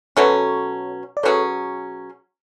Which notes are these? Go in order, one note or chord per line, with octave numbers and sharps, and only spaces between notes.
B2 F#3 C#4 A4 C#5
D5
B2 F#3 C#4 G#4 A4 C#5